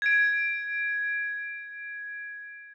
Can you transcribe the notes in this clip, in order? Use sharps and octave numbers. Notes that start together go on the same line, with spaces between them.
G#6 D7